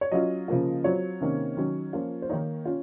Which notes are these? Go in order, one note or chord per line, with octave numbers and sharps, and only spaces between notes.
C#5
F#3 C#4 F4 D#5
C#3 F3 A#3 F4
F#3 C4 F4 C#5
C3 D#3 A#3 C#4
D#3 F#3 C#4
F3 A#3 C#4 F4
C5
D#3 A#3 D#4 C#5
C#4 F4